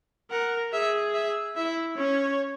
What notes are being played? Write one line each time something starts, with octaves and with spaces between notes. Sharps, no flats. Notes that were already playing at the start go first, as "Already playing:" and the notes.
A#4 F#5
G#4 E5
E5
E4 E5
C#4 C#5